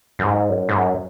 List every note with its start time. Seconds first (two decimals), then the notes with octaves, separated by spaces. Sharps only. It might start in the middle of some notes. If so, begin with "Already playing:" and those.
0.19 F#2
0.24 G#2
0.50 F#2
0.69 G#2
0.76 F#2